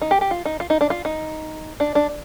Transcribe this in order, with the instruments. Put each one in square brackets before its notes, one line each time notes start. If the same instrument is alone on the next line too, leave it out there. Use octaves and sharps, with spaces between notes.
[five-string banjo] D#4
G4
G4
F4
D#4
F4
D#4
D4
F4
D#4
D4
D4